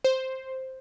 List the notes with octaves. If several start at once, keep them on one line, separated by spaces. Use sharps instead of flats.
C5